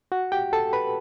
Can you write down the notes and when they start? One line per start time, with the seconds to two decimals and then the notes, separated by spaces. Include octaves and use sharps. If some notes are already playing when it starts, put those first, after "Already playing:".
0.12 F#4 F#5
0.32 G4 G5
0.53 A4 A5
0.73 B4 B5